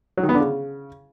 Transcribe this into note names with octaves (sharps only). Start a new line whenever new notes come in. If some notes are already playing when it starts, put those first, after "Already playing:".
F#3
D#3
B3
D3
C#3